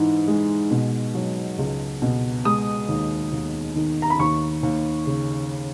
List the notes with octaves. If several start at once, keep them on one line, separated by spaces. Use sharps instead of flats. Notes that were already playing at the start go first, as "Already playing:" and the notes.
Already playing: G#2 E3
G#3
B2
F#3
C#2
B2
G#3 D#6
D#2
D#2
D#3
A#5
B5
D#2 C#6
D#2
C#3